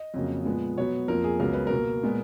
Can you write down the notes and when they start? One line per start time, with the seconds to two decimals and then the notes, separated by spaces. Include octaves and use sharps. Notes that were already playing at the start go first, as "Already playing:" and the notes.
Already playing: D#5
0.14 F2 C#3 F#3 A#3
0.45 A#2 F3 G#3 B3
0.77 B2 F#3 B3 C#5
1.08 F2 F3 A#3 A#4
1.24 G#4
1.39 C#2 C#3 F#3 B3 A#4
1.53 B4
1.67 B2 A#4
1.76 A#3
2.03 A#2 G#3 B3